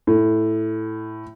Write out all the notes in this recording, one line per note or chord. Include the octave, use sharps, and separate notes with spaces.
A2